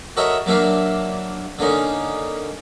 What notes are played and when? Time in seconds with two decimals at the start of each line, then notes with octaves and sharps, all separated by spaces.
0.17 F#4 A4 A#4 C#5 D#5 E5
0.46 F#3 A#3 D4 E5 F5
1.59 D3 A#3 C#4 D#4